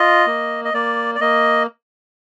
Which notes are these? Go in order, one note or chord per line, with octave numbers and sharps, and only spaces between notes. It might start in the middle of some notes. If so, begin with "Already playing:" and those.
Already playing: F4 D#5
A#3
D#5
A#3 D5
D5
A#3 D#5